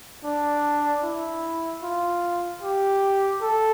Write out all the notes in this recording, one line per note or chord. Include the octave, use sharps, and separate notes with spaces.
D4
E4
F4
G4
A4